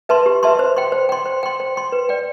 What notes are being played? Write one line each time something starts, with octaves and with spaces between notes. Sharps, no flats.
B4 E5 A5 C6
G4
B4 E5 A5 C6
C5
G5 C6
C5
G5 C6
C5
G5 C6
C5
G5 C6
B4
D5 G5